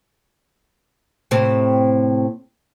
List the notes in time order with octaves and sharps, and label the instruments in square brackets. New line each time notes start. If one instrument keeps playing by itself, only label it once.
[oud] A2 C3 C4